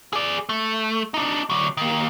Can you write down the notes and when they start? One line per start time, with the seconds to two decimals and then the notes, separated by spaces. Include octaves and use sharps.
0.13 G#4 D5
0.49 A3
1.14 D4 D#4
1.50 D3 F#3
1.77 D#3 A#3